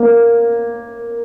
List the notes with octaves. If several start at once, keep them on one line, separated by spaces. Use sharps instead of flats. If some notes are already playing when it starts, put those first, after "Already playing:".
Already playing: A#3